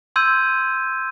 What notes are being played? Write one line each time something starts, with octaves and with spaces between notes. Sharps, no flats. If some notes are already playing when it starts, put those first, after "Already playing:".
C6 E6 G6 G#6 D#7